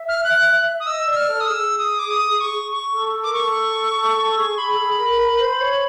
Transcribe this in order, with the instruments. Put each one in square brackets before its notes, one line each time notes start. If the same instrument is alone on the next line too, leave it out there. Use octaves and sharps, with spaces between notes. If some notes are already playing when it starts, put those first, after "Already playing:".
Already playing: [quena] E5
[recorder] F6
F#6
D#6
[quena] D#5 [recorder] E6
[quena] D5 [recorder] E6
[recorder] F6
[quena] A4
[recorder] D#6
[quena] G#4 [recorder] E6
[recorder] D#6
D6
D#6
C#6
C#6
[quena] A4
A4
[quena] A#4 [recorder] D6
[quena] A4 [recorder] C#6
[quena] A4
A4
G#4
[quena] G#4 [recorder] B5
[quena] A4
G#4
A#4
A#4
C5
C#5